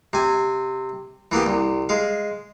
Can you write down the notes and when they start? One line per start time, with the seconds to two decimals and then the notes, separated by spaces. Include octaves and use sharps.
0.13 C3 G#5
1.32 E3 A#3 B3 G4
1.46 C2
1.89 G#3 F5